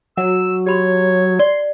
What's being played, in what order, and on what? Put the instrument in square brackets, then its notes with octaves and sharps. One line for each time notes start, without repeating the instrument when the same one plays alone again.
[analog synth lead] F#3 [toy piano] F#5 [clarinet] E6
[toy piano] G4 B5 C6 [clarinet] C#5
[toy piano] D5 [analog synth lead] C6